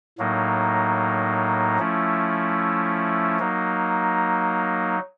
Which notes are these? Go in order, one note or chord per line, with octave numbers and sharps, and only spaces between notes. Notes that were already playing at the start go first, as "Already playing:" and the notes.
A2 F#3 A#3 D#4
F3 A3 C#4 E4
F#3 A#3 D#4